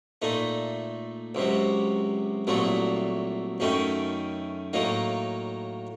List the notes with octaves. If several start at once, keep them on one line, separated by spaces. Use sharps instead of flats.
A#2 A3 D#4
C#2 C3 F#3
C2 A#2 F#3 A3
F#2 D#3 A3 C#4
A2 F#3 A#3 D#4